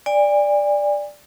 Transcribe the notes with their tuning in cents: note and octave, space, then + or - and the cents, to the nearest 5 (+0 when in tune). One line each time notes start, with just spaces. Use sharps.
D5 +0 G#5 -40